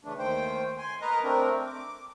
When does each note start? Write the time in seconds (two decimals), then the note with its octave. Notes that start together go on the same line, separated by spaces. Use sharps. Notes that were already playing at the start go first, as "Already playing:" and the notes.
0.05 C#3 E3 A3 D4
0.18 D#2 D#3 A3 C5 G5
0.78 G#5 C6
1.01 A#4 B4 D#5 A#5
1.23 A3 C4 D4 A#4
1.66 D6